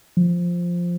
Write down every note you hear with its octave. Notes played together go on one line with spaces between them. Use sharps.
F3